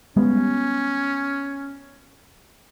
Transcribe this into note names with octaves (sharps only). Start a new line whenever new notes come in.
G3 G#3 B3 C#4